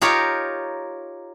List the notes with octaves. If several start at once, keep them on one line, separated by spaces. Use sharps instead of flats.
D#4 F4 G4 A#4 C#5